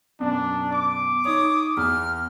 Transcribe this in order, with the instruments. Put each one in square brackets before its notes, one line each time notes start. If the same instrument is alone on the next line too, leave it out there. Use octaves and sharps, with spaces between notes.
[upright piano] F#2 B2 [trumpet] D4
[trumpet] D6
[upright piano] D#4 C#5 [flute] D#6
[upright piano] E2 [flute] F6